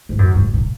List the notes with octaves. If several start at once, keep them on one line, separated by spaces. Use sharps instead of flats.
G#2
F#2
G#2
A#2